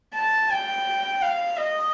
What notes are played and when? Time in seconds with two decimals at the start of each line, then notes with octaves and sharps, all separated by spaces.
0.15 A5
0.50 G5
1.22 F5
1.58 D#5